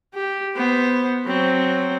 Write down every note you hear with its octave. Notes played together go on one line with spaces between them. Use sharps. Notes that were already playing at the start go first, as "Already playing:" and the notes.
G4
B3 C5
F#3 C4